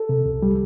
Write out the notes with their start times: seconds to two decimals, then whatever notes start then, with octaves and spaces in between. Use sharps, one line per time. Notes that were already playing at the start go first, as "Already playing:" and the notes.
Already playing: A4
0.09 C3
0.26 C2
0.42 G3